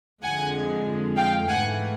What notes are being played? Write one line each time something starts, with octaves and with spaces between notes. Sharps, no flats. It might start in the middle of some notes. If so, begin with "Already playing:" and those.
F2 D3 F3 G#3 F#5 G#5
F5 G5
G#2 E3 A3 F#5 G#5